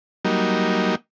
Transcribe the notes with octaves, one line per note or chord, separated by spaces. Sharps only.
F#3 G3 A#3 D#4